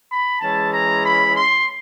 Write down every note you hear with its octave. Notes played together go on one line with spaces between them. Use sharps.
B5
E3 G#3 C#4 E4 A5
A#5
B5
C6